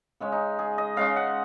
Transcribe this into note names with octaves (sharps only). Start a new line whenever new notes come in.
C#3 G#3 C#4
D#4
G#4
D#5
C#3 G#3 C#4 F5
F#5